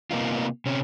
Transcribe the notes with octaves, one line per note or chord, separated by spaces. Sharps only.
C3 A#3 B3 D#4 F4
C3 C#4